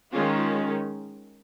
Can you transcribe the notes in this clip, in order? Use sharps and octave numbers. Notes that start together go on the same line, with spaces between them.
D#3 G#3 C#4 F4